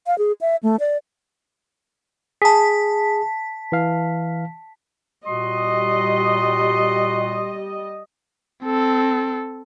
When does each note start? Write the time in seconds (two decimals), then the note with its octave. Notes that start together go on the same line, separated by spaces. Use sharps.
0.07 F5
0.18 G#4
0.41 E5
0.63 A3
0.80 D5
2.42 G#4 A5 B6
3.72 E3 F5
5.26 A#2 G3 F#4 D#5 C6
8.64 C4 A4